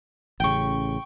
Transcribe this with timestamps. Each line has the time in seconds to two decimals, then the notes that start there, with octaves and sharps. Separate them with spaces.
0.40 A1 C#3 G5 C#6